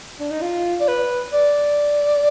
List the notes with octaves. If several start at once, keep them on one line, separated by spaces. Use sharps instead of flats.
D4
D#4
F4
D5
B4
D5